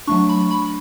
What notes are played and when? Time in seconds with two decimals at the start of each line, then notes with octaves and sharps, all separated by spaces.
0.07 F#3 A3 D4 C#6
0.29 B5
0.51 B5